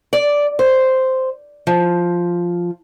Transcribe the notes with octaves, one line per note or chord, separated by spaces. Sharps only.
D5
C5
F3